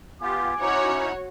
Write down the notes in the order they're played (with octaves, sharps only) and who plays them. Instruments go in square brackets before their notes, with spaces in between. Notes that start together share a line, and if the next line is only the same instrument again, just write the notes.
[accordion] B3 F4 G4 [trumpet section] G#5 D6
[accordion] C#4 D#4 E4 [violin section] F#4 C#5